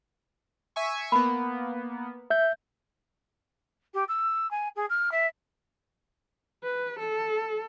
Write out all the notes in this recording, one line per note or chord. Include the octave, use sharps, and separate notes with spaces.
E5 G#5 C#6
A#3 B3 B5
E5 G6
G4
E6
G#5
G#4
F6
E5
B4
A4